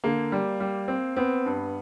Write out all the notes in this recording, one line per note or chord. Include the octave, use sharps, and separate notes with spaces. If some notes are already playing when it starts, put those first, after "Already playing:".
D3 A#3
G3
G3
C4
B3 C4
G2